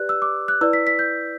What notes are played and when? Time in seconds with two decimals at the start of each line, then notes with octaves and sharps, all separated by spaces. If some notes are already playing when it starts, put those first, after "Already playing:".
Already playing: G4 B4 D5 F#6
0.09 E6
0.22 D6
0.48 F#6
0.61 E4 B4 D5 E6
0.73 B6
0.87 B6
0.99 G6